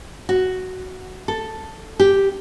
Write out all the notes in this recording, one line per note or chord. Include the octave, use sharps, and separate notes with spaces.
F#4
A4
G4